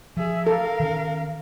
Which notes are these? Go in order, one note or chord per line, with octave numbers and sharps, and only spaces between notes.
F3 G#4 E5
A4 A#4 F5
D#3 C#4